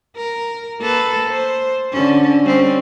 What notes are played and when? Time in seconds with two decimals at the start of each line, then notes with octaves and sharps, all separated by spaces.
0.16 A#4
0.81 A#3 A4 B4
1.30 C5
1.91 D3 C#4
2.45 G3 C4 C#4